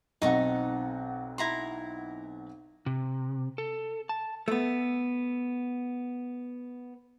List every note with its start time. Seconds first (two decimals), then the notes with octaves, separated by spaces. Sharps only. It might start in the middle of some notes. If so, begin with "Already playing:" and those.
0.22 B1 C4 D#4 A4 F#5 C#6
1.38 E4 A#5 C6
2.86 C3
3.58 A4
4.09 A5
4.48 A3 B3